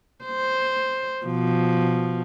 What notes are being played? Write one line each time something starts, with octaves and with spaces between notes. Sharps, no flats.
C5
B2 F3